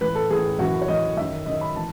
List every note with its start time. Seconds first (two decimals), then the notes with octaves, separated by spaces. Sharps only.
0.01 A2 E3 B4
0.15 A4
0.30 A2 E3 G#4
0.59 F#2 E3 F#4
0.82 C#5
0.88 F#2 E3 D#5
1.17 F#2 D#3 E5
1.46 F#2 D#3 D#5
1.61 B5
1.76 E3 A5